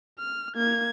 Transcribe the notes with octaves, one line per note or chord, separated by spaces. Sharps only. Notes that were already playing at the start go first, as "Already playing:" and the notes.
F6
A#3 G#6